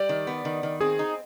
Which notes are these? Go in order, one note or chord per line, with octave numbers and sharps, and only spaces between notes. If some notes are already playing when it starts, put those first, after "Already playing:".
Already playing: G3 D5
D#3
B3
D#3
D#3
C4 G#4
D#4